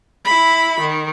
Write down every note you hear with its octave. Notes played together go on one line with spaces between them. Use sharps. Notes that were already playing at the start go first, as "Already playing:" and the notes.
E4 B5
D#3